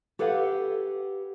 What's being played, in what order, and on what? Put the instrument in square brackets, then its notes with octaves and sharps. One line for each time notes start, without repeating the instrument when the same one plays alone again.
[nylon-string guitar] G4 A4 B4 C#5 F5 F#5